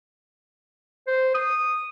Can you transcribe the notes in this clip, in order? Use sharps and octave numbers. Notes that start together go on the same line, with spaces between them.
C5
D#6